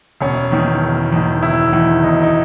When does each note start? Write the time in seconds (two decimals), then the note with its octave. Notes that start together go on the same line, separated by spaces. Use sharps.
0.21 E1 C#4
0.52 E2 D#3
0.81 E1
1.12 E2 D#3
1.42 E1 E4
1.72 E2 D#3
2.03 E1 D#4
2.23 D#4